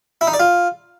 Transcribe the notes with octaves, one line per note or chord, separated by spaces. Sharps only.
E4
D#4
D5
F4